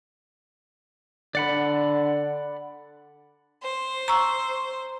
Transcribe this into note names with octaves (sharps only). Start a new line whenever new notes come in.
D3 D5 F#5 B5
C5
A#5 C#6 E6